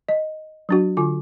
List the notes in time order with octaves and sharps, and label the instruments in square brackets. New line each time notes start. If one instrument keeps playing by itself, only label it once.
[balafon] D#5
F#3 D4 F#4
D3 F4 D6